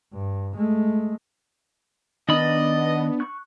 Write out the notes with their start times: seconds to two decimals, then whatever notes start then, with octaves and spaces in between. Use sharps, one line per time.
0.13 G2
0.56 G#3 A3
2.29 D#3 B3 D4 D#5 A5 B5
3.20 C#6 F#6